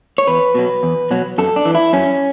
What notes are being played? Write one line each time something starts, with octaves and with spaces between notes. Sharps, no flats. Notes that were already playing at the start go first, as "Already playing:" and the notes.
C#5
E2 B4
B2 F#3
E2
B2 F#3
F#2 A4
D4
E3
E4
F#2 C#4